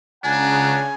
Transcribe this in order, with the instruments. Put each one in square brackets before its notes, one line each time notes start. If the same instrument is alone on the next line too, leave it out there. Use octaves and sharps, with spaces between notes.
[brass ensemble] C#2 F#5 A#5 [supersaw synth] C#3 [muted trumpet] D4 [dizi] G#5